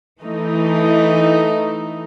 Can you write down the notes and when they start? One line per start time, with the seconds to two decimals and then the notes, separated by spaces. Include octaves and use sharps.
0.21 E3 A3 D#4